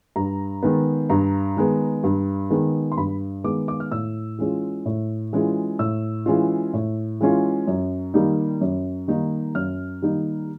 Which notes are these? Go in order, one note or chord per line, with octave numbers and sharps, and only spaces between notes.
G2 A#5
D#3 G#3 B3
G2 A#5
D#3 G#3 B3
G2
D#3 G#3 B3
C6
G2 B5
D#3 G#3 B3 D6
D6
F6
A2 E6
E3 G#3 C#4 F4
A2
E3 G#3 C#4 F4
A2 E6
E3 G#3 C#4 F4
A2
E3 G#3 C#4 F4
F#2
D#3 G3 A#3 D#4
F#2
D#3 G3 A#3 D#4
F#2 F6
D#3 G3 A#3 D#4